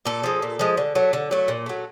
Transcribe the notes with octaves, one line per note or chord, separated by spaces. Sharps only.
A#2 A4
F3 G#3
A#2
F3 G#3
D3
F#3 A3
D3
F#3 A3
A#2
F#3 A3